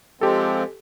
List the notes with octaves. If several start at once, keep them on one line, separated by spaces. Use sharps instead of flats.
F3 G#3 C4 G4 A4